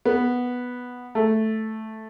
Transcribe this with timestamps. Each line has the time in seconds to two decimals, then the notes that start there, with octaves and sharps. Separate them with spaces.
0.05 B3
1.15 A3